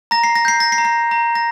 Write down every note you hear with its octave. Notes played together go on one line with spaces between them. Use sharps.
A#5 A#6
C7
A#6
G6 C7
A#6
C7
A#5
A#6
A#5
A#6